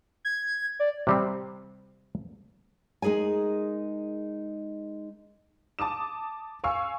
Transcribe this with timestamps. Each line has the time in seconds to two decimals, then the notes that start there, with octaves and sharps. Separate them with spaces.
0.25 G#6
0.80 D5
1.07 C3 G3 C4
3.02 G#3 D#4 G#4 A#4 G#5
5.79 A5 D6 D#6 E7
6.64 F5 G#5 C#6 E6